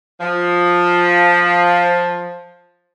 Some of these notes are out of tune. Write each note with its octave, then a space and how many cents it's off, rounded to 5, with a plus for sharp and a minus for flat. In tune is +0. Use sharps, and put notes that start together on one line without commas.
F3 +10